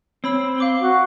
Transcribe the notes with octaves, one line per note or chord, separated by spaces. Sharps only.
C4 C#5 B5 E6
F5 D6 G7
F#4